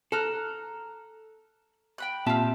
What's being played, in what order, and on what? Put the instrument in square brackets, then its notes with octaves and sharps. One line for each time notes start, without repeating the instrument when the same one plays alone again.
[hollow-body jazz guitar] A4 [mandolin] A#5 F6 F#6
[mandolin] G5 B5 F#6
[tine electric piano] A#2 [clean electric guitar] C4 E5 A5 [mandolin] F4 G4